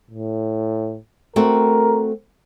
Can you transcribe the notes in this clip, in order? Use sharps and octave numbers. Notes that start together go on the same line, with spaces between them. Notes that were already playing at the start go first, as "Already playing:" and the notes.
A2
A3 C4 F#4 A#4